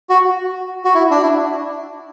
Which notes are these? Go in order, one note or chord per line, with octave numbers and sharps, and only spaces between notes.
F#4
F#4
E4
D4
E4